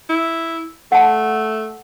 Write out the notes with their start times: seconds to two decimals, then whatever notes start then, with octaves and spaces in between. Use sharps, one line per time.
0.09 E4
0.92 A3 F#5 A5